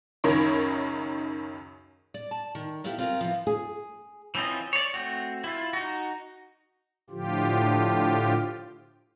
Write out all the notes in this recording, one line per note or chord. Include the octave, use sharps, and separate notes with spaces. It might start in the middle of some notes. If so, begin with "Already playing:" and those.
C#2 F#2 D#3 A#4 C#5
D5
A5
D#3
A3 B3 E4 F4 G4
C4 F4 A#4
E3 F3
G#4
E3 C4 C#4 F4 D#5
C#5 D5
A3 C4 F#4
E4 F4
D#4 F#4
A2 D3 F3 F4 G4